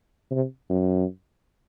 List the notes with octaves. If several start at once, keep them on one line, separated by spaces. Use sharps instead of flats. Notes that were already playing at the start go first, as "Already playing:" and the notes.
C3
F#2